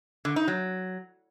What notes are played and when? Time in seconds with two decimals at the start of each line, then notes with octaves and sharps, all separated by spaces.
0.25 D3
0.36 D#4
0.48 F#3